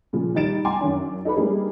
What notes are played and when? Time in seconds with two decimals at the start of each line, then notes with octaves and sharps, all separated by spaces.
0.13 A#2 C#3 F3
0.35 D#3 G3 D#4 A6 D7 E7
0.65 G5 G#5 A#5 C6 D6
0.81 F#2 D#3 C#4 D4
1.25 D#4 A4 B4 B5
1.36 G3 G#3 A#3 D4 D#4 G#4